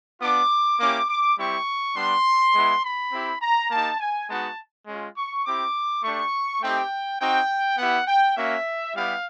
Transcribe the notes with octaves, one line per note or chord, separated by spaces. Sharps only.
B3 D4 F4 D6
A#3 C#4 E4 G4 D6
D6
G3 C4 E4 G4 C#6
G3 B3 D4 C6
G#3 B3 E4
B5
C4 E4 G4
A#5
A#3 D#4 G4 A5
G#5
G#3 B3 D#4 F#4 A5
G#3 C#4 F4
C#6
C4 E4 G4 D6
A3 D4 G4 C#6
A3 C4 D#4 G4 G5
C4 D#4 F#4 G5
B3 E4 G4 F#5
G5
A#3 C#4 F#4 E5
G3 B3 E4 G4 F5